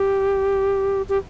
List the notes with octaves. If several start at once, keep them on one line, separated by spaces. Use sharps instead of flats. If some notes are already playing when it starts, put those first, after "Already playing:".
Already playing: G4
G4